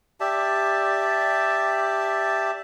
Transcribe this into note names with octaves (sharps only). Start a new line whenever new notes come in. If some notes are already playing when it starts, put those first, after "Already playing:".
G4 D5 E5 A5